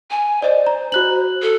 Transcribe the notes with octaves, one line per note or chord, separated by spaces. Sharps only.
G#5
C5 D5 D#5
A#5
F#4 F#6 F#7
A4